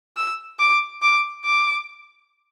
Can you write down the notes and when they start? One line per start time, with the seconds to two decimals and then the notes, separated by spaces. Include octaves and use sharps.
0.17 E6
0.60 D6
1.02 D6
1.45 D6